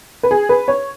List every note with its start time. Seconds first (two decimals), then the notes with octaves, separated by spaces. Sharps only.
0.23 B4
0.31 G#4
0.49 B4
0.68 C#5